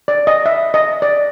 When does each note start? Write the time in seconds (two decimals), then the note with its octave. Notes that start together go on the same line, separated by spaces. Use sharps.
0.08 D5
0.27 D#5
0.46 E5
0.74 D#5
1.02 D5